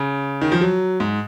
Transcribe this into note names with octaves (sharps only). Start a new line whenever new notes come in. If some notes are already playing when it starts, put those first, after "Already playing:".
Already playing: C#3
D#3
F3
F#3
G#2